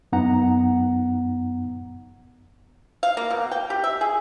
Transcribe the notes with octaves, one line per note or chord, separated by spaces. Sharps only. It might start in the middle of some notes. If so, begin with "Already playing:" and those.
F#2 B3 D#4 F#5 A#5
F5
A#3
B2
G5
G4
E5
G#4